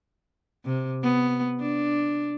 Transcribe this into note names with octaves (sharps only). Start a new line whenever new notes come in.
C3
B3
D4